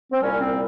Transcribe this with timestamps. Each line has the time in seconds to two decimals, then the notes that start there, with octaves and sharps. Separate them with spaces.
0.12 C4
0.21 C2 A#2 G3 C#4
0.41 C4